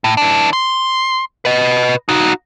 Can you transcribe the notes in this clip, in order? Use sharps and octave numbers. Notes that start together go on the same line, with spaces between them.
A2
E3 D4
C6
B4 D#5
D#4 F#4